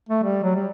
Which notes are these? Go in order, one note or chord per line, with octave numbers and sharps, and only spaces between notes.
A3
G3
F#3
G3